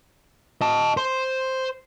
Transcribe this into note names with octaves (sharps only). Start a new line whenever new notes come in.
D#5 A5
C5